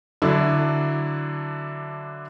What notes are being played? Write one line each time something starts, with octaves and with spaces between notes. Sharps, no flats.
D3 F#3 D4 E4